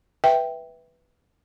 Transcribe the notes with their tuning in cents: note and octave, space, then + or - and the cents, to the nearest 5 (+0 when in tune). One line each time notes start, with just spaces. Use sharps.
B4 +0 E5 -5 G5 +0